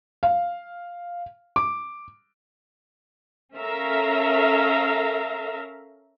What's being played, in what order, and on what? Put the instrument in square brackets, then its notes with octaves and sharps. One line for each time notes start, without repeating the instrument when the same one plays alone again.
[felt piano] F5
D6
[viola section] C#4 A4 A#4 E5 F5 A#5